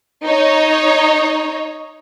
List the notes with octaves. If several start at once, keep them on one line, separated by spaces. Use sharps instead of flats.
D#4 C#5